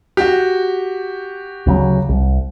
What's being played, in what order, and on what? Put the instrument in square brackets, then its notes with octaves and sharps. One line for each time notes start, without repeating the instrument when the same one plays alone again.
[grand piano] F#4 G4
[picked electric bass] D2 C#3 F#3
C2